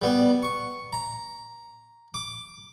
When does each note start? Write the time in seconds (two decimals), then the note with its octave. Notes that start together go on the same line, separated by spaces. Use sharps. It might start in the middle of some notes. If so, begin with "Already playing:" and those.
0.02 G3 B3
0.42 C#6
0.93 A#5
2.14 D6